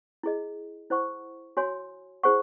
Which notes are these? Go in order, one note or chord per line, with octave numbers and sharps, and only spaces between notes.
E4 G#4 D#5
E4 C5 F#5 C#6
F#4 C#5 G#5 C6
E4 G#4 C5 F#5 C#6